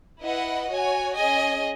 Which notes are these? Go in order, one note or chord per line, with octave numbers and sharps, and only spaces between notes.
E4 B4 D#5 F#5
F#4 C#5 G#5
C#4 G#4 D#5 G#5